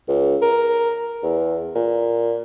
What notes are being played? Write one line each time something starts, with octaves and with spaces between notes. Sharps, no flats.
C#2
A#4
E2
A#2